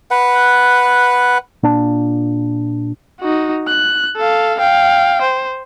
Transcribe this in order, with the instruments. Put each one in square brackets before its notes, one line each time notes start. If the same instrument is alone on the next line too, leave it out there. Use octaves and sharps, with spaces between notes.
[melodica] B4 F#5
[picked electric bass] A#2 D4
[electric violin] D#4 F#4
F#6
A4 F5
F5 G5
C5